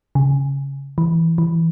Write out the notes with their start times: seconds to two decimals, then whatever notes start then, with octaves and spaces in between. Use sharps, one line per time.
0.15 C#3
0.98 E3
1.38 E3